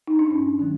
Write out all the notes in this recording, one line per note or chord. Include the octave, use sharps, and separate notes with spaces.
D#4
D4
G2 C#4
D#3 F#3 A3